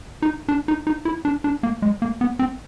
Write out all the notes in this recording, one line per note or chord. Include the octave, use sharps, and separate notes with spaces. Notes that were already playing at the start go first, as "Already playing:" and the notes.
D#4
D4
D#4
D#4
E4
D4
D4
A#3
G#3
A#3
B3
C4